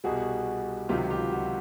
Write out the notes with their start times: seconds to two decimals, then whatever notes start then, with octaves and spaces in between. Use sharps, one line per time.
0.04 C2 B2 G3 F#4 G#4
0.89 C#2 C3 D#3 F#3 F4 G4
1.10 F4 G4
1.32 F#4